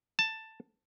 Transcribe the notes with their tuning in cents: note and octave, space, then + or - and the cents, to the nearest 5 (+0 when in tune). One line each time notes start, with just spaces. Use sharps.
A5 +10